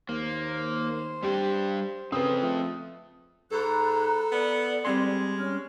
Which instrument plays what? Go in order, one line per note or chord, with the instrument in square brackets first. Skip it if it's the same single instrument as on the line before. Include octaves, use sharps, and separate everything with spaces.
[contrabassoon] D#2 [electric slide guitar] A#3 [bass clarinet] C5
[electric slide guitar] G3 D4 G5 [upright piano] G4
[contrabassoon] C#3 [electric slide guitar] C4 A4 [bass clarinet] C#4 [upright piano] B4 D#6
[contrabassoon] F3 [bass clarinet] A3
[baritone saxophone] G#2 [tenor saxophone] A4 [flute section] A#5 B5 F#6
[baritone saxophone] B3 [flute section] D5
[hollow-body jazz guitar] G3 C4 C6 [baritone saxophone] G#3
[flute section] C#4 F6